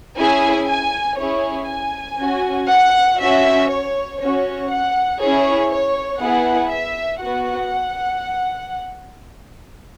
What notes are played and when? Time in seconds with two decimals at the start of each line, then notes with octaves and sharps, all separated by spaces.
0.17 C#4 E4 G#4 G#5
0.67 G#5
1.18 C#4 E4 G#4 C#5
1.68 G#5
2.19 C#4 F#4
2.69 F#5
3.19 C#4 F#4 E5
3.69 C#5
4.20 C#4 F#4 C#5
4.70 F#5
5.20 C#4 E4 G#4 C#5
5.70 C#5
6.20 B3 E4 G#4 F#5
6.71 E5
7.21 B3 F#4 F#5